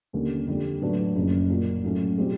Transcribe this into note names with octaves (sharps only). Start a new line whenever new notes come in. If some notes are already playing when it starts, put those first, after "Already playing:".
D#2 D3 G3 A#3 C#4
F2 D3 G3
A2 F#3 B3 D4
F#1 F#2 C#3 F3
A#2 F#3 A#3
A2 F#3 A3 C#4
B2 G3 C4 F4 G#4